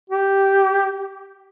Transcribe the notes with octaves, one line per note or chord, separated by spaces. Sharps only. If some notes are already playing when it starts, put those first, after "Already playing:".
G4